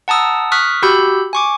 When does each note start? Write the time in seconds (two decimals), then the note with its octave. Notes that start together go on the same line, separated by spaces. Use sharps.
0.08 F#5 A5 A#5 D#6 E6
0.52 C#6 D#6 F6 F#6 B6
0.83 F#4 G4 B5 E6 G6
1.33 G#5 C#6 D6